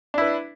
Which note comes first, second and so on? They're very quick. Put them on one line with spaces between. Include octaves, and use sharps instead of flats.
D4 E4 B4